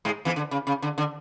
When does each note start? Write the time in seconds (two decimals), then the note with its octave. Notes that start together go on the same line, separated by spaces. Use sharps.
0.05 G#2 G#3
0.25 E2 E3
0.36 D3
0.51 C#3
0.67 C#3
0.82 D3
0.98 D3